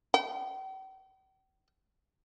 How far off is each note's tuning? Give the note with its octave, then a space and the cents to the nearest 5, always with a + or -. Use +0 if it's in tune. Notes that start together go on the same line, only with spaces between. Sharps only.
G5 -45